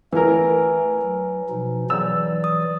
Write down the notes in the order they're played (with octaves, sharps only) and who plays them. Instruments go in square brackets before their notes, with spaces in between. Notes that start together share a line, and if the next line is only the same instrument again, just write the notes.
[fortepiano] E3 A#4 [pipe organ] A3 [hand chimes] B4 G#5
[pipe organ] F#3
B2 F3 D#4
[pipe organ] E3 F#3 D5 [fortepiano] E6
[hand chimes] D#6